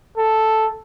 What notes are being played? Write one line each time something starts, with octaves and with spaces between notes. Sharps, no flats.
A4